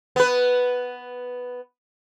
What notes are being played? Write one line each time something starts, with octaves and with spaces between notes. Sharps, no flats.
B3 B4